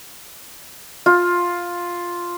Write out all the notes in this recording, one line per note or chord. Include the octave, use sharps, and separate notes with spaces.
F4